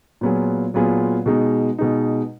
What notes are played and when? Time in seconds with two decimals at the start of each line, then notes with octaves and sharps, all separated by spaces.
0.21 A#2 F#3 B3 F4 G#4
0.74 A#2 F#3 B3 F4 G#4
1.26 B2 G#3 D#4
1.79 B2 G#3 D#4